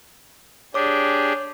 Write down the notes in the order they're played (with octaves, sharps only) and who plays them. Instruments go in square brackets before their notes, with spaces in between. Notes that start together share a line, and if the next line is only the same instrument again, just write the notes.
[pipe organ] D4 G4 G#4 [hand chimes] C#5 D6